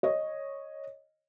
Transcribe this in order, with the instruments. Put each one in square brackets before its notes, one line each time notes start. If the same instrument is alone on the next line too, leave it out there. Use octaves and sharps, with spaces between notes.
[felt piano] C#5 D#5